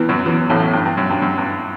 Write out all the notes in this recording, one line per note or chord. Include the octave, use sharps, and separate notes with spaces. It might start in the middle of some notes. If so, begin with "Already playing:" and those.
Already playing: E2 E3
F#2 F#3
E2 E3
A1 A2
G2
G2
F#2
G2
F#2
G2